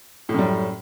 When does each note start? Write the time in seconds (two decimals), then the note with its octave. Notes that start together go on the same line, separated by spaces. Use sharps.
0.29 A2
0.34 F#2
0.39 G3